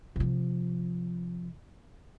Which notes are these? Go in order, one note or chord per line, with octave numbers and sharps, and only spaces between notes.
C3 F3